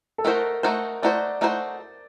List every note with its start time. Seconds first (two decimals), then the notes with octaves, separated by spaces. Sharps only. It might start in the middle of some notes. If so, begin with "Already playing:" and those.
0.18 A4
0.25 A3 D#4 F#4 A#4 C5
0.63 A3 D#4 F#4 C5
1.02 A3 D#4 F#4 C5 D5
1.41 A3 D#4 F#4 C5